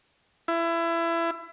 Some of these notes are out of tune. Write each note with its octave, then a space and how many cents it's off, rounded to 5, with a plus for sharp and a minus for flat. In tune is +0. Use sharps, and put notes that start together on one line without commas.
E4 +25